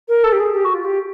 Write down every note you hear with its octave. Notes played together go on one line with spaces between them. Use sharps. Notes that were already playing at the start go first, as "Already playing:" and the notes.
A#4
A4
G4
G#4
G4
F#4
F4
G4